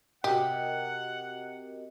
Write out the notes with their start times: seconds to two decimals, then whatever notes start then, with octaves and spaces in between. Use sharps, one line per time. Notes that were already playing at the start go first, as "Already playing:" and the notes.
0.24 C3 F#4 G4 A#4 D#5 F#5